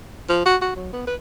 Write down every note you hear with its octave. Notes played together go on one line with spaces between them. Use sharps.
F3
F#4
F#4
F#3
B3
B4